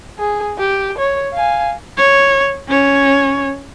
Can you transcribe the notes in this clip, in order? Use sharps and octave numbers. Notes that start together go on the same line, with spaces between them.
G#4
G4
C#5
F5 G#5
C#5
C#4 C#5